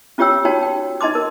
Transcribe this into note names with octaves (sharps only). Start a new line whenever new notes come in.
C#4 F4 G4 C#5 G5 E6
D#4 F#4 C#5 G5 A5
G5
D#4 D#5 A5 C6 D6
A#4